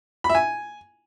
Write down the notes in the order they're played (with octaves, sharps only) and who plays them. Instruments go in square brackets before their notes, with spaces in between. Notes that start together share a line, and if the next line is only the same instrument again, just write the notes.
[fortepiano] B5
E5
G#5